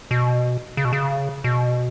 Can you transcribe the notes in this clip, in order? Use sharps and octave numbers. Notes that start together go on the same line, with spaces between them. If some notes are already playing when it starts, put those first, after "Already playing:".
B2
C#3
B2
C#3
B2